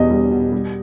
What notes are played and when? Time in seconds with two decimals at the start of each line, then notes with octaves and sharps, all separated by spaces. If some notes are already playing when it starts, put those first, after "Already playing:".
Already playing: E2 B2 G3 D#5
0.10 G3
0.31 B2
0.52 G3